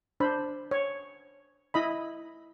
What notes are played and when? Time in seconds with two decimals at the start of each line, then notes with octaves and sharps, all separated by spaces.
0.20 D4 C5 B5
0.71 C#5
1.74 E4 D#5 B5